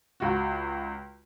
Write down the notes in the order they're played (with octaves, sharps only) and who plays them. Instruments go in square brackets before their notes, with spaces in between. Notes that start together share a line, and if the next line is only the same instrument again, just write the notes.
[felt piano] C#2 F#4